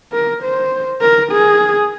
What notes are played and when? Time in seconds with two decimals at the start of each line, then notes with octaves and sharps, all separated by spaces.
0.12 A#4
0.43 C5
1.02 A#4
1.32 G#4